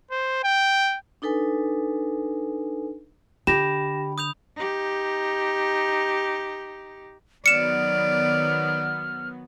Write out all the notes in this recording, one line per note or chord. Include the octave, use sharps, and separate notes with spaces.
C5
G5
D4 D#4 A4 B4 G#5
D3 G4 B5 A#6 E7
D#6 G6 F7
D#4 G4
D#3 F#3 B3 D5 F6 C#7 E7